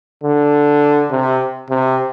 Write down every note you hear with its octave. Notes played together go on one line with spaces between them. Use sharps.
D3
C3
C3